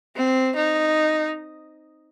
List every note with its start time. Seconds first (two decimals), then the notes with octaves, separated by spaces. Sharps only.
0.16 C4
0.56 D#4